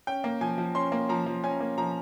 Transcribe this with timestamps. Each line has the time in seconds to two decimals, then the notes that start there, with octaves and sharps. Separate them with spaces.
0.07 C#4 G5
0.24 A#3
0.41 F3 G#5
0.58 F3
0.75 C#4 C6
0.92 A#3
1.09 F3 A#5
1.26 F3
1.44 C#4 G#5
1.60 A#3
1.78 F3 A#5